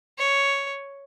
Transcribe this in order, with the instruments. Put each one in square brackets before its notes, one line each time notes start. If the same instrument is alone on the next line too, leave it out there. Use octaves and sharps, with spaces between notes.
[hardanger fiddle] C#5